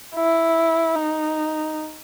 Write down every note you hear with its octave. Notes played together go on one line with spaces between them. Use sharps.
E4
D#4